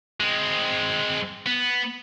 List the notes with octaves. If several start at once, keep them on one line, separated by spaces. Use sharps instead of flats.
G#3 C4
B3